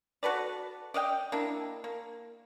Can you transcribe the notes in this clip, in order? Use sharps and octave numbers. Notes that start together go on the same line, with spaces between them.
F#4 A4 B4 D5
D5 D#5 F5 G5
A#3 D4 E4
A#3